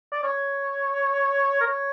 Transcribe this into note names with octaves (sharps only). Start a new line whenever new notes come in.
D5
C#5
A#4
C#5